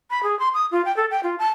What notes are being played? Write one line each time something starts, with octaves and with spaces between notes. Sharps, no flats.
B5
G#4
C6
D#6
F4
G5
A4
G5
F4
A5